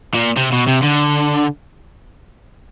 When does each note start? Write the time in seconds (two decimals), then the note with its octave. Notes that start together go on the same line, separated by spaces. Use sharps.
0.14 A#2
0.37 C3
0.52 B2
0.67 C3
0.83 D3